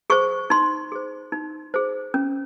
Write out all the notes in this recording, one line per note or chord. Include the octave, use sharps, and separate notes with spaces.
G#4 C5 C#6
D#4 C6
G#4 C5
D#4
G#4 C5
C#4